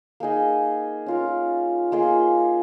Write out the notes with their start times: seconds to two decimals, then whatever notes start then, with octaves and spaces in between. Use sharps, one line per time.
0.20 A#3 D#4 G#4 D#5
1.06 C#4 F4 A#4
1.92 A#3 F4 G#4 D#5